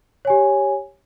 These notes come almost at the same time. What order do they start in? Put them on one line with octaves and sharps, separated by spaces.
C#5 G#5 G4